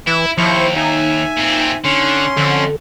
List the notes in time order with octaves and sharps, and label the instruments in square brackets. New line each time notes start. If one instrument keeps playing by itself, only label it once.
[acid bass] E3 [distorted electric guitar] E4
[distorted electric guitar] D#2 [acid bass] F3 [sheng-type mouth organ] E4 C5 C#6
[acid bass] D#4 [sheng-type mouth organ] E5 G#5
[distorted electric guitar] A#2 C4
[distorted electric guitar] D3 [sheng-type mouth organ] C#4 C6
[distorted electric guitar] F2 [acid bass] D3